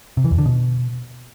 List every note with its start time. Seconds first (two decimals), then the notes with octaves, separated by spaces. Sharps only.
0.17 C3
0.24 E3
0.31 E2
0.38 D3
0.45 B2